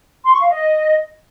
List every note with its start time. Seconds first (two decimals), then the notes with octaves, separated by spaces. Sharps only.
0.24 C6
0.32 C#6
0.41 F5
0.49 D#5